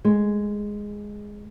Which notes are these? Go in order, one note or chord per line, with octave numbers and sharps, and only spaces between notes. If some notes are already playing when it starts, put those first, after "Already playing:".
G#3